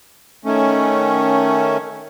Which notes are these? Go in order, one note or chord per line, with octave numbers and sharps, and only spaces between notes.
D#3 A3 C#4